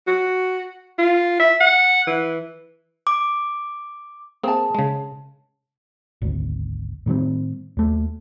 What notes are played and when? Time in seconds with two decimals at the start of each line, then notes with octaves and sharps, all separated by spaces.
0.08 F#4
0.99 F4
1.40 E5
1.61 F#5
2.07 E3
3.07 D6
4.43 A#3 C4 G#4 A5
4.75 C#3 G#3
6.22 G#1 D2
7.06 A2 D#3 G3 C4
7.77 D#2 A3